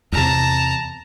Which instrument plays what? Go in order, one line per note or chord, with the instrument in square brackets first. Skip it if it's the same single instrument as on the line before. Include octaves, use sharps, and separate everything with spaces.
[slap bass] E2 C3 [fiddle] A5 A#5